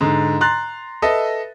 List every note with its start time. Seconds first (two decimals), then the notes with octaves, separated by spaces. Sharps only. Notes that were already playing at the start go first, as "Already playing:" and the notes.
0.01 G#2 D3
0.41 A#5 C6 F#6 A6
1.02 A4 B4 D#5 E5